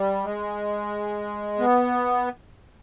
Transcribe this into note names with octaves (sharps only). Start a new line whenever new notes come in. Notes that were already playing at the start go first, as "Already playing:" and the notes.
Already playing: G3
G#3
B3